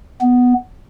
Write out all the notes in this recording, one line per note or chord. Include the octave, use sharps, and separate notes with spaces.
B3